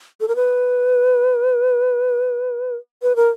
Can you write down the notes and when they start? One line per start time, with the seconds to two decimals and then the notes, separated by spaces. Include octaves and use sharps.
0.20 A4
0.28 A#4
0.36 B4
3.02 B4
3.16 A#4